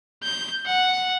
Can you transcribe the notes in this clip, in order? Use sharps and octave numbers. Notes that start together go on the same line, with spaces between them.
G6
F#5